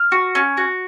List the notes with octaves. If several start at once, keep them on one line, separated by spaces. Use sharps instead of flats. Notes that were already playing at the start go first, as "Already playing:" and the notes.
Already playing: F6
F#4
C#4
F#4